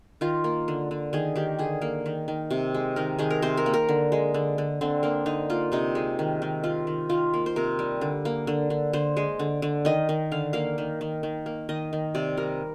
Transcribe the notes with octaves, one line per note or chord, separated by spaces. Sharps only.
D#3 F4
A#3
D3
D3
D#3 G#4
D#3 G4
D3 G#4
A#3
D#3
D#3
C3
G#3
D#3 A#4
D#3 G#4
A#4
C3 C5
A#4
A#3
A#4
D3
G#3
D3
D3
D3 C4
A#3 D4
D3 D#4
A#3 F4
C3 D#4
G#3
D#3
D#3
D#3 F4
D#3
D#3 F4
A#3
C5
C3 A#4
G3
D3
A#3
D3
D3
D3 C5
G#3
D3
D3
D#3 D#5
D#3
D3 F5
A#3 F5
D#3
D#3
D#3
A#3
D#3 D#5
D#3
C3 D5
G3 A#4